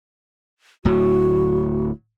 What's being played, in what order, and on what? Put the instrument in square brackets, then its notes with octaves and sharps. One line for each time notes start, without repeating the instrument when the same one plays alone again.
[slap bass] D1 A2 F#3 [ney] F#4